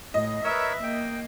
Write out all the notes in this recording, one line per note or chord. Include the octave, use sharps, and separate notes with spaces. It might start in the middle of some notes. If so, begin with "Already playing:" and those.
A2 D#5
A#4 B4 C#5 E5 E6
A#3 G5